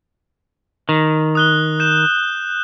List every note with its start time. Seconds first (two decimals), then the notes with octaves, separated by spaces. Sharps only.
0.89 D#3
1.35 D#6 F#6 G7
1.80 G6 E7